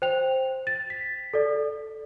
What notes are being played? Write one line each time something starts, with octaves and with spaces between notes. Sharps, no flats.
C5 G5 F7
A6
B6
A4 D5